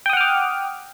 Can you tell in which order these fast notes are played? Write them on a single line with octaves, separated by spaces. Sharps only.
G5 D#6 F#5 F6 D6